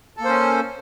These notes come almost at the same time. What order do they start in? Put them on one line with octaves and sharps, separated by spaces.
A4 A#3 C5 C#4